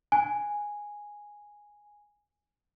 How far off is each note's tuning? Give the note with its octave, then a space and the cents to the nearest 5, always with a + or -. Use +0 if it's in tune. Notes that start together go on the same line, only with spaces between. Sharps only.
G#5 -5